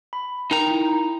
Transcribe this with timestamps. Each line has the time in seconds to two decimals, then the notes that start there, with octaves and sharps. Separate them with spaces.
0.13 B5
0.51 D#4 A#4 G5 A#5
0.71 E4